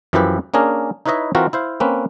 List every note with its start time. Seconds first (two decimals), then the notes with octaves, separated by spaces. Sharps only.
0.13 F#2 E3 F3 E4 G4 B4
0.54 A#3 C#4 D4 G#4 A#4
1.06 D#4 E4 B4 C#5 D#5 E5
1.35 E3 C4 F4 F#4 A#4
1.53 E4 C5 F5
1.80 A#3 C4 C#4 B4